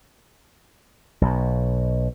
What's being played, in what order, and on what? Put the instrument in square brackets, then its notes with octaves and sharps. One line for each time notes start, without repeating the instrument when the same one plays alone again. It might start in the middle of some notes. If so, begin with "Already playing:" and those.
[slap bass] B1 B2